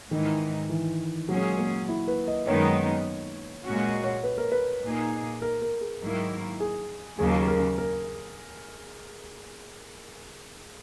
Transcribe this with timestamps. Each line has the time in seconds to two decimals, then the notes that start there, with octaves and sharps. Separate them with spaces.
0.11 G#2 D#3 E3 G#3 D#4
0.70 E3
1.29 A#2 F#3 G#3 C#4 G#4
1.59 A#3
1.89 E4
2.08 B4
2.28 D#5
2.47 F#2 D#3 G#3 B3 D#4 C#5
3.65 A#2 G#3 C#4 F#4
3.85 D#5
4.04 C#5
4.24 B4
4.38 A#4
4.52 B4
4.83 A#2 A#3 D#4 G#4
5.42 A#4
5.62 A#4
5.81 G#4
6.01 G#2 D#3 F#3 A#3 E4
6.60 G#4
7.18 D#2 C#3 F#3 A#3 G#4
7.48 A#4
7.78 A#4